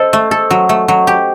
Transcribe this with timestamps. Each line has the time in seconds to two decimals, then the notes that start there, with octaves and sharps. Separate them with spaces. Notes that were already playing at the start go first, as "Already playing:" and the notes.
Already playing: A4 C5 D#5
0.13 A3
0.31 A4
0.50 F#3
0.69 A3
0.88 F#3
1.07 G4